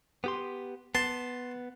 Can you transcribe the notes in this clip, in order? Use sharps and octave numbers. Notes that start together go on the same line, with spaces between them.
B3 G4 C6
B3 A5 C6